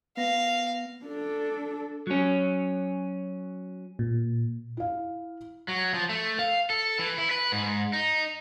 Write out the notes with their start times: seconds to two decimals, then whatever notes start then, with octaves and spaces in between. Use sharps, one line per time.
0.17 B3 F5 A#6
1.04 D4 A4
2.07 F#3 C#4
3.99 A#2
4.77 E4 F5
5.68 F#3
5.94 F3
6.09 A3
6.39 F5
6.70 A4
6.99 E3
7.18 E4
7.31 B4
7.52 G#2
7.93 D#4